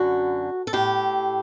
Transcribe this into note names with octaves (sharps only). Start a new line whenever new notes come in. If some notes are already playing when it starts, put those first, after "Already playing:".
Already playing: F#2 D3 F#4
A4
A2 G4